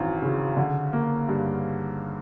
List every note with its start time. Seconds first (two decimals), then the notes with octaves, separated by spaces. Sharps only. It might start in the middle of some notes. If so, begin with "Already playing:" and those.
Already playing: G#1 F#2 E3
0.22 C#3
0.57 D3
0.93 A#3
1.29 G2